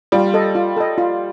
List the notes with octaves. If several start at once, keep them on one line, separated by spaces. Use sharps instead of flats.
G3 F4
A4 D#5
F4
A4 D#5
F4